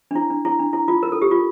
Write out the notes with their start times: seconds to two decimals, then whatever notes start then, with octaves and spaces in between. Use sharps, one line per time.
0.11 D4
0.15 E4
0.30 D4
0.45 E4
0.59 D4
0.73 E4
0.88 F4
1.03 A#4
1.12 A4
1.22 G4
1.31 F4